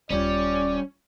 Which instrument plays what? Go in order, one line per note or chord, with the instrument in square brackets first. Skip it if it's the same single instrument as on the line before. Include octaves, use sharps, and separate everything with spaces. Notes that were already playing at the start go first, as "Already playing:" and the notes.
[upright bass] D#1 F4 [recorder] G3 [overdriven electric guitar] C#4 [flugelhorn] D5